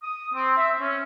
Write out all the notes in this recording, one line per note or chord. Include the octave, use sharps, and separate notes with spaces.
D#6
C4
E5
C#4